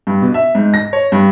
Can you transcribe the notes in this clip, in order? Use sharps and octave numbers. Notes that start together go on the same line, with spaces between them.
G2
B2
E5
G#2
A#6
C#5
G2